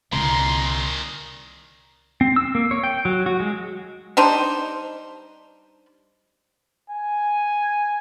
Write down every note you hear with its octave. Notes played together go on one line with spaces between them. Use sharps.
C2 A#2 D3 D#3 A#5 C6
C4
E6
A#3
C#5
G5
F#3
F#4
G#3
G3 D4 D#4 C5
G#5